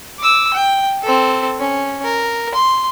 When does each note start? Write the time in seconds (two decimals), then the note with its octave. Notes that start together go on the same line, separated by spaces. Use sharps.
0.19 D6 E6
0.54 G5
1.02 C4 A4
1.59 C#4
2.04 A#4
2.54 C6